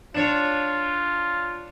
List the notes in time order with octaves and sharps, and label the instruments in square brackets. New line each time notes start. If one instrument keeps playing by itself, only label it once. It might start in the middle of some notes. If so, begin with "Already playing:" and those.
[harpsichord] D4 C#5 [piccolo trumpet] F4